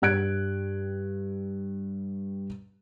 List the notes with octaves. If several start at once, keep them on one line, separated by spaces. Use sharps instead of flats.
G2 G3 F#6 G#6 D7